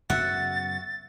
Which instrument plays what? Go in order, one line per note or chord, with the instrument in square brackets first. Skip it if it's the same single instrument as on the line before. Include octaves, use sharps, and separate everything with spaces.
[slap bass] F#2 C#3 B3 [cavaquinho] F#4 E5 F#5 [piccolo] A6